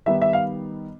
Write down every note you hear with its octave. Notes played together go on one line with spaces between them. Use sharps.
D#3 G3 B3 D#4 E5
E5
F5